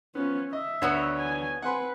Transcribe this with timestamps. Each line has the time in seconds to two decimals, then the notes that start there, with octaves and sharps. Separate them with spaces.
0.15 F3 B3 C#4
0.53 D#5 E5
0.82 D2 B3 F#4 C#5
1.18 G#5
1.62 C4 B4 F#5 G#5 C6